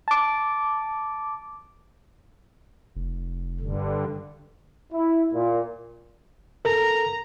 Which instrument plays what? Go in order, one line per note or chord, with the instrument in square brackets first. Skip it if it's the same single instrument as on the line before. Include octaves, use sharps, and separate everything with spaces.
[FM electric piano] A5 D6
[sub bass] F1
[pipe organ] G2 D3
[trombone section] E4
A#2
[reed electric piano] A4 A#4 [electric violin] A#5